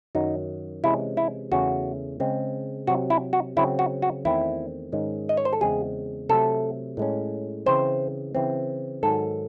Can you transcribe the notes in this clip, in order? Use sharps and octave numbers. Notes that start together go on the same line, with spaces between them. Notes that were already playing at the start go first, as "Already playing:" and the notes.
F#2 D#3 F#3 D#4
C3 E3 G#3 C#4 E4
E4
E2 C#3 E3 A3 C#4 F#4
C#3 G#3 C4
C3 F#3 C4 F#4
E4
F#4
C#3 F#3 C4 E4
F#4
F#4
E2 D#3 A3 C4 E4
G#2 D#3 G#3 C#4
D#5
C#5
C5
A4
E2 C#3 G#3 C4 G#4
C3 F#3 A3 A4
A2 G#3 C#4
C#3 E3 C4 C5
C#3 E3 C4
G#2 D#3 F#3 A4